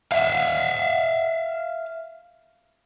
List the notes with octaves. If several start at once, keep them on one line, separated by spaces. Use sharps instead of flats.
E5 F5